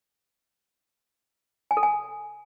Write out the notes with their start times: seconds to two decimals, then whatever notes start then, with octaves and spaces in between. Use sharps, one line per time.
1.71 G#5
1.77 A4
1.83 G#5